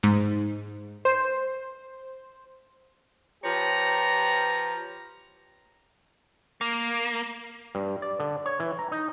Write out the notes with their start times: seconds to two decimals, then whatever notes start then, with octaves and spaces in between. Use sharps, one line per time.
0.03 G#2
1.05 C5
3.44 F3 G4 B4 C#5 A#5
6.61 A#3
7.75 G2
8.02 D5
8.20 D3
8.46 C#5
8.60 E3
8.79 A#5
8.92 D#4